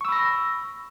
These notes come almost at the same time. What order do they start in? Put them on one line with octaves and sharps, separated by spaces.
C#6 E6 B5 A#6